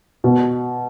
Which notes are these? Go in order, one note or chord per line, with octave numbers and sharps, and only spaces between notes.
B2